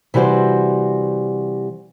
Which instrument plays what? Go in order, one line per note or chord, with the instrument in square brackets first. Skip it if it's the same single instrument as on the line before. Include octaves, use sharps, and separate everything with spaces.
[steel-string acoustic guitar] C3 E3 G3 F#4 C5